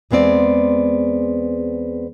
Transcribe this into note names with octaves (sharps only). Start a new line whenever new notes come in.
E2 G#3 B3 C4 D5